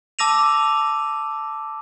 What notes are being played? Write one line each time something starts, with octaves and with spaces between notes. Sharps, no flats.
A5 D6 E6 A#6 D#7 F7